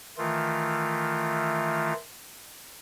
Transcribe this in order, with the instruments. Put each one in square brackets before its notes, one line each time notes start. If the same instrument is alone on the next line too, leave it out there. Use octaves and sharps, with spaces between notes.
[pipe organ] D#3 E3 A3 F4